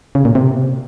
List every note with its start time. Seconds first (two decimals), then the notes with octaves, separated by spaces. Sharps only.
0.15 C#3
0.25 A#2
0.35 C3